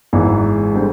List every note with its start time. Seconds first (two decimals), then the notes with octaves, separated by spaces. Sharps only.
0.13 G#1 G#2 E3 G#3
0.74 D3 G3 C4